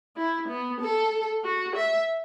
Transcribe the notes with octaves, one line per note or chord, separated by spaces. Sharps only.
E4
B3
A4
F#4
E5